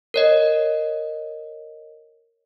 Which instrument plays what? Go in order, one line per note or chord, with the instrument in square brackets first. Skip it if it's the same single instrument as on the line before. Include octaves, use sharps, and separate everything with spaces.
[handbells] A#4 C#5 D#5